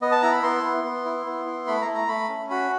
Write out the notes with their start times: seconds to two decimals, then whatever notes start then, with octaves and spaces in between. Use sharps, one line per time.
0.02 B3 D#5
0.12 A5
0.22 E4 A#5
0.32 B5
0.43 B3 C6
0.63 B3
0.84 B3
1.05 E4
1.26 B3
1.46 E4
1.67 A3 B5
1.82 A#5
1.87 A3
1.94 A#5
2.08 A3 B5
2.29 C#4
2.50 F#4 B5